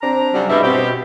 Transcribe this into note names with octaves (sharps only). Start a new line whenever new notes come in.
C4 D4 A#5
C#3 F#3 G3
G2 B2 G3 G#3 E4
B2 C4 G4